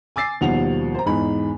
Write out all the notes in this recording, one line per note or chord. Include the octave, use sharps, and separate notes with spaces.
G#5 D6 E6 A6 C7
D#2 B2 F3 G3 F#5 F7
C5 A#5
E2 G#2 D#4 B5